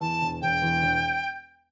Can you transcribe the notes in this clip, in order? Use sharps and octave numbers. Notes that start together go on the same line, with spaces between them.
E2 A5
E1
E1 G5
E2
E1